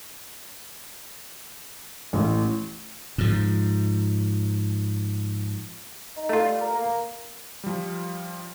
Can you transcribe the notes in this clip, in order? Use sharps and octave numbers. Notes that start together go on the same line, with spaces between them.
A1
G#2 F3
D#4
A3 F4
G3
A#4
A#3
F3 G3